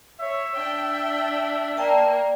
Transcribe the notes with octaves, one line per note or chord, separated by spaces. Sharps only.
C#5 E5
D4 G5
A#3 D5 G5 A5